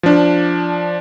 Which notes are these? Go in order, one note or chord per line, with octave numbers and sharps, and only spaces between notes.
F3 D4